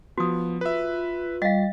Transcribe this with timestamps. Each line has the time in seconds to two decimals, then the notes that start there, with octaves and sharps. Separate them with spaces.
0.18 F3 B3 F#4 D#6
0.61 F4 B4 E5
1.42 G3 D#5 F5 A6